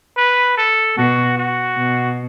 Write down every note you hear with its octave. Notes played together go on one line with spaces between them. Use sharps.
B4
A4
B2 F#4
F#4
B2